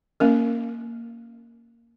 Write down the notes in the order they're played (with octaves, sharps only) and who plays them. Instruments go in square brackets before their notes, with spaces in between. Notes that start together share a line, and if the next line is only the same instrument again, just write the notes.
[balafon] A#3 C#4 A#4